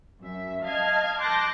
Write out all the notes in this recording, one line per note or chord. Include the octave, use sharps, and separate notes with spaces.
F#2 E5
D#5 F5 A5 F6 G#6
A5 C6 D6 F#6 G6 A#6